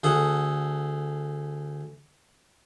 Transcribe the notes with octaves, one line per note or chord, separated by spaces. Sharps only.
D2 G#4 A4 F#5